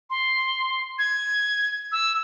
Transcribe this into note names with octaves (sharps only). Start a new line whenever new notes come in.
C6
G#6
E6